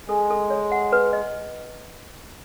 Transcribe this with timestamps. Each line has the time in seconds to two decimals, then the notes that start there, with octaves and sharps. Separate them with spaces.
0.08 G#3 A4
0.30 A4
0.50 C#5
0.72 F#5
0.92 B4
1.13 D#5